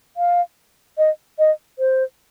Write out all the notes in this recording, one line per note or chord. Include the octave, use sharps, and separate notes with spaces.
F5
D#5
D#5
C5